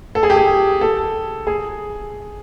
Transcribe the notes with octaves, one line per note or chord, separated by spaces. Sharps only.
A4
G#4
G4
G#4
A4
G#4